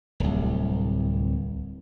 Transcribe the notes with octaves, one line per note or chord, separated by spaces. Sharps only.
D1 C2